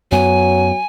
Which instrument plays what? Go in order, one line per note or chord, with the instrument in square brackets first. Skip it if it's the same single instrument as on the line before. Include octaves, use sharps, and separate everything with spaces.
[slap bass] F#2 B3 [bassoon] F#3 [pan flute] G#5